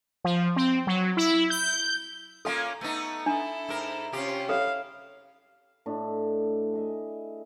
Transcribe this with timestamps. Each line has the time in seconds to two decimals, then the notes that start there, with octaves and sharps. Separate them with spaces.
0.24 F3
0.56 C4
0.87 F#3
1.17 E4
1.50 G6
2.45 A#3 C#4 F4 A4 F5
2.81 A3 B3 D#4
3.26 D4 E4 A4
3.69 G#2 A#4
4.13 C3 C#4 F4 G4
4.49 E4 A4 C#5 F5
5.86 A2 D4 D#5 E5
6.73 G#4 D#5 E5